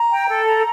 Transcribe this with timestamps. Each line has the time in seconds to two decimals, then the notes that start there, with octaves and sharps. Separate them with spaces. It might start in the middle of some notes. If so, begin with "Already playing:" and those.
Already playing: A#5
0.11 G5
0.28 A4
0.46 A#5